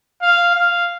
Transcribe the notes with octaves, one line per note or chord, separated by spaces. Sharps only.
F5
F5